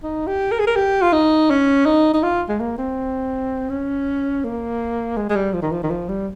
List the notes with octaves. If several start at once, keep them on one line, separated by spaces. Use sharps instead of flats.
D#4
G4
A#4
G#4
A#4
G4
F4
D#4
C#4
D#4
D#4
F4
G#3
A#3
C4
C#4
A#3
G#3
G#3
G3
F3
D#3
F3
D#3
F3
G3